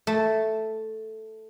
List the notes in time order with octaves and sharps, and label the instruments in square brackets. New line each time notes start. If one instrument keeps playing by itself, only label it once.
[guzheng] A3